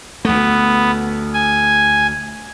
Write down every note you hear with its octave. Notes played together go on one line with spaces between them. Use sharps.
D2 A3 B3
G#5